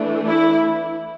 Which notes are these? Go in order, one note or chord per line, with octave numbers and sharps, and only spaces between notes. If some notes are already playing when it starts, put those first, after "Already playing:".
Already playing: E3 A3 D4
E4